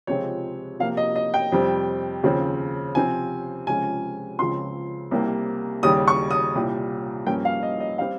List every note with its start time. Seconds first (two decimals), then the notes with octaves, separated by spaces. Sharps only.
0.07 C#2 C3 F3 G#3 C4 C#5
0.80 C3 F3 A#3 F5
0.97 D#5
1.16 D#5
1.34 G5
1.52 F2 C3 G3 C4
2.23 D#2 C#3 F3 C4
2.95 C3 F3 C4 G#5
3.67 C#2 C3 F3 G#3 C#4 G#5
4.39 C#2 C#3 F3 C4 C6
5.11 C2 C3 G3 A#3
5.83 D#2 C#3 G3 D#6
6.08 C#6
6.31 D#6
6.55 C2 A#2 G3
7.26 G2 F3 A#3 C#4 G5
7.45 F5
7.63 D#5
7.80 D#5
7.98 G3 C4 F5